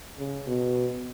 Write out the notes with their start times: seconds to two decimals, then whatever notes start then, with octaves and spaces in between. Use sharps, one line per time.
0.18 C#3
0.47 B2